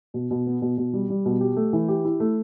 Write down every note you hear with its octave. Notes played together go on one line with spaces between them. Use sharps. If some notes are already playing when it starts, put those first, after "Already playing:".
B2
B2
B3
B2
B2
G3
G3
B2
G4
A3
E3
G4
E4
A3